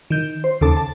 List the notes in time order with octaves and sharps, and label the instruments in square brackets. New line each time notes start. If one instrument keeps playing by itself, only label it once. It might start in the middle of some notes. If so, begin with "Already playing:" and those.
[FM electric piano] D#3 G6
C5
D#2 C#3 A4 A5 D6
A5